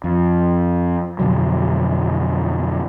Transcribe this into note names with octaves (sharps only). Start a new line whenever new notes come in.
F2
F2 B2 D3 F#3